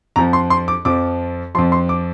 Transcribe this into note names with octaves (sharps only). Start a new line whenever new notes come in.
F2 F3 A#5
C6
C6
D6
F2 F3 D6
F2 F3 C6
C6
D6